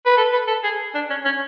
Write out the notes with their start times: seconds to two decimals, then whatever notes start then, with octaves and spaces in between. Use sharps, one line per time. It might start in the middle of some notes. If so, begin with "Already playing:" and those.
0.06 B4
0.17 A4
0.33 B4
0.47 A4
0.64 G#4
0.94 D4
1.10 C#4
1.25 C#4